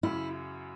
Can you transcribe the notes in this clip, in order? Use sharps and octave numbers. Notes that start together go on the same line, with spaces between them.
F#2 C#3 F#3 E4